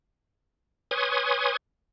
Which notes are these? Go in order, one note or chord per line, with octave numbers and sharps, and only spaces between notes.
B4 C#5 G#5 C6 C#6 D#6